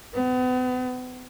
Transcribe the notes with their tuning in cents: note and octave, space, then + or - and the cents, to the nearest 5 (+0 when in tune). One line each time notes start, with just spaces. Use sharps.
B3 +35